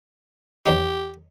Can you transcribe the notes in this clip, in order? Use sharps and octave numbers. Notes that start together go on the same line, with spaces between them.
E2 F#3 D#4 G4